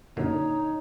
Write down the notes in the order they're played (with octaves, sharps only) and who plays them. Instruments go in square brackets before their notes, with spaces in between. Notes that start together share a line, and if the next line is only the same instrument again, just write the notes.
[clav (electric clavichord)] F#2 A#2 D3 [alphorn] D#4 [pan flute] C#5